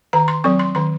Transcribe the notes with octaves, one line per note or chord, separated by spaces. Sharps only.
D#3 A#5
C6
F#3 C4 C#6
C6
D#3 C6